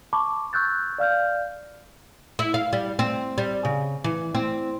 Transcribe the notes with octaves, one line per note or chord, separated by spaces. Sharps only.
A5 B5 C#6 D6
C#6 E6 F#6 G6 A6
D5 F5 F6 G6
E4
F5
G3
C4
G3
C#3
E3
C4